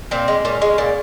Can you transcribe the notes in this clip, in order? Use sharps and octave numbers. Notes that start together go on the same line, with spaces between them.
A#2 C4
G#3
A#2 C#4
G#3
A#2